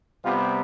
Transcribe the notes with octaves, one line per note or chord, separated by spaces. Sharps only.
C3 G3 B3 F4